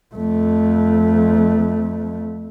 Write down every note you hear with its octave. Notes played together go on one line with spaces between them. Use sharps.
F2 A3